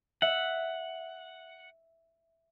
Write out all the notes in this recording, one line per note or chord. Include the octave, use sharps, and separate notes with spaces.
E5 F#5